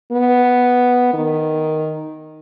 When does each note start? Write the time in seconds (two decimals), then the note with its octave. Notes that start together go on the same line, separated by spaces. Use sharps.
0.12 B3
1.13 D#3